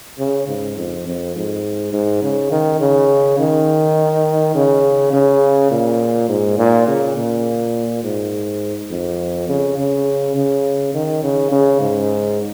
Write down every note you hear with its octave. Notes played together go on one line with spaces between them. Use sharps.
C#3
G#2
F2
F2
G#2
G#2
C#3
D#3
C#3
D#3
C#3
C#3
A#2
G#2
A#2
C#3
A#2
G#2
F2
C#3
C#3
C#3
D#3
C#3
C#3
G#2